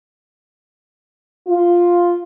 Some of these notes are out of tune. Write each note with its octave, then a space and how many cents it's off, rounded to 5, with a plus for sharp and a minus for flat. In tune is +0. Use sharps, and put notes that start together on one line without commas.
F4 +0